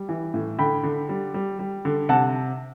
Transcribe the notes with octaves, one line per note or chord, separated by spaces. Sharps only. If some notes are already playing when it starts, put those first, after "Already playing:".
Already playing: G3
E3
A2
D3 G5 B5
D3
G3
G3
G3
D3
C3 F#5 A5